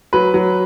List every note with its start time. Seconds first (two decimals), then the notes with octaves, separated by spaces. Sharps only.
0.13 F#3 B4
0.34 F#3